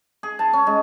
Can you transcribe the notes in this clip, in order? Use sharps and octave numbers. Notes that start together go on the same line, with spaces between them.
G#4
A5
C#4
G#3